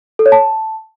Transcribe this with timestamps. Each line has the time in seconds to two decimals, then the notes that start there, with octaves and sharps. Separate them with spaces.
0.19 A4
0.26 C#5
0.32 A5